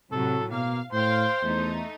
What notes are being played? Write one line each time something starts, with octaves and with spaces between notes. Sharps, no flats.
A2 C3 F#3 A4
B2 A#3 F5
A2 C5 F5 G5 C6
E2 A3 D#4